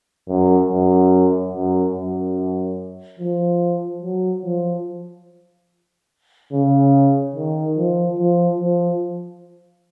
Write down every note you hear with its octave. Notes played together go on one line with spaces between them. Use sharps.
F#2
F#2
F#2
F#2
F3
F#3
F3
C#3
D#3
F3
F3
F3